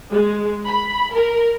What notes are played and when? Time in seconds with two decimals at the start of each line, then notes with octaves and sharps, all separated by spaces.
0.11 G#3
0.67 B5
1.13 A#4